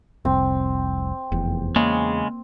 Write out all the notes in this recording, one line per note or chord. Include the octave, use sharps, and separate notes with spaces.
F1 C2 C4
F1 E2
C#3 G#3 A#3